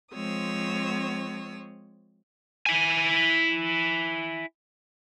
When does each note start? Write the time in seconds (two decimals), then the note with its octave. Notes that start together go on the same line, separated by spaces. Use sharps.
0.14 F3 G#3 C4 C#5 D#6 E6
2.66 E4 G#5